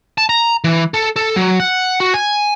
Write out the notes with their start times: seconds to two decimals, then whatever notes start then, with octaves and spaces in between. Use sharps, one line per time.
0.18 A5
0.29 A#5
0.64 E3
0.94 A4
1.16 A4
1.36 F#3
1.60 F#5
2.00 F#4
2.14 G#5